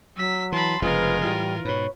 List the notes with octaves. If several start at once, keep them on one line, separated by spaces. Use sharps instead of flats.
F#3 E6 B6
E3 A5 B5 C6
F1 C#3 F3 G#3 F4 A#4 B4
A2 E3 G3
G#2 B2 B4 C#5